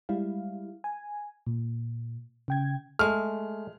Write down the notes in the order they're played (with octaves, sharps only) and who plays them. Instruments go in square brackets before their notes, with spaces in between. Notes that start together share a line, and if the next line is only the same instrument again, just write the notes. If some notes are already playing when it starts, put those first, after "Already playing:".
[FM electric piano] G3 G#3 E4 F5
G#5
A#2
C#3 G5 G#6
[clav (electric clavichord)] G#3 A3 [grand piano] F6